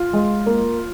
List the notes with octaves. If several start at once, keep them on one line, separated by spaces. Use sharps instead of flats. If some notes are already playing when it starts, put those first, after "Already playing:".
Already playing: F4
G#3
A#3